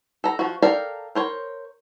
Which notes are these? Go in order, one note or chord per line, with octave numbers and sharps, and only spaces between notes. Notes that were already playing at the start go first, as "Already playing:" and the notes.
A4 A#5
F3 F#4
A4 A#4 D5 F5 G5
A#4 C5 C#5